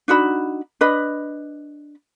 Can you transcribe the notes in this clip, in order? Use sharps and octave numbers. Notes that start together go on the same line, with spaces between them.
D4 D#4 F#4 B5
D4 B4 D#5 B5